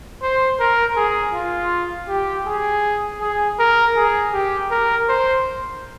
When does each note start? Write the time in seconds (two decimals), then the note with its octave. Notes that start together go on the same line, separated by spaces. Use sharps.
0.23 C5
0.60 A#4
0.96 G#4
1.34 F4
2.09 G4
2.46 G#4
3.21 G#4
3.59 A#4
3.96 G#4
4.33 G4
4.71 A#4
5.09 C5